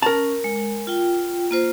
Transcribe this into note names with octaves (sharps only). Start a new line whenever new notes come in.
C#4 A#4 A5
G#3
F4 G5
A#3 F4 C5